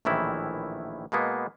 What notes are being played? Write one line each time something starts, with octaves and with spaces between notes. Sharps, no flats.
A#1 A2 D#3 E3 E4
B2 G#3 A#3 B3